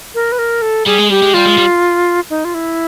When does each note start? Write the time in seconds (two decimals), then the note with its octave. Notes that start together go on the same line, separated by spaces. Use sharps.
0.15 A#4
0.32 B4
0.39 A#4
0.62 A4
0.86 G3 G#4
0.98 G#3
1.10 G3 G4
1.22 G#3
1.34 G3 F4
1.46 G#3
1.58 G3
2.30 D#4
2.45 F4
2.54 E4